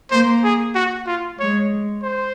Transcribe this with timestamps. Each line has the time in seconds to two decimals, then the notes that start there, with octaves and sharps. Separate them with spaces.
0.11 A#3 C5
0.44 G#4
0.75 F#4
1.06 F4
1.39 G#3 C#5
2.02 C5